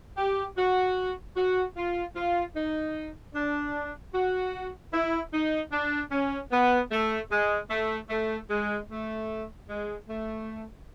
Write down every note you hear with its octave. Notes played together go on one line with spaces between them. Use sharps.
G4
F#4
F#4
F4
F4
D#4
D4
F#4
E4
D#4
D4
C#4
B3
A3
G#3
A3
A3
G#3
A3
G#3
A3